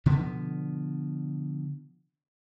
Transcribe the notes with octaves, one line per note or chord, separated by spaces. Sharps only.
B2 D3 F3 B3